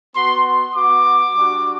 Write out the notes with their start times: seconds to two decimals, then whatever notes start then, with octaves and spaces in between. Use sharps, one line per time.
0.14 B3 F#4 C6
0.45 C6
0.75 B3 F#4 D6
1.35 G3 D4 F#4